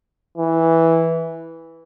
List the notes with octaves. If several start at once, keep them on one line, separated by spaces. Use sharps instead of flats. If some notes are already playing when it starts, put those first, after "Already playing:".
E3